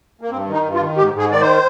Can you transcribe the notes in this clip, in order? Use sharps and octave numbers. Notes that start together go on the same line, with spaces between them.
A#3
G2 C4
D#3
D#4
G2
F4
D#3
G#2 G4
G#2 G#4
D#3 D5
C5